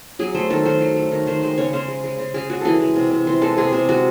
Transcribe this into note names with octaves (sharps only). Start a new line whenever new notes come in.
F#3 G#4
A3 C5
D#3 A4
D#3 C5
F#3
A3
D#3
D#3 C5
G#3 C5
C#3 C#5
C#3 C5
G#3
G#3
C#3
C#3 G#4
G#3 F#4
E3 G#4 A4
G#3
C3
C3
E3 C5
G#3 A4
C3 G#4
C3
G#3 F#4